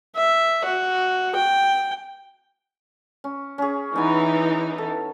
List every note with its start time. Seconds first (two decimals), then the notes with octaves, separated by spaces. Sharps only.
0.16 E5
0.65 F#4
1.35 G5
3.24 C#4
3.58 C#4 G#4
3.96 E3 B3 D#4 G#5
4.78 A4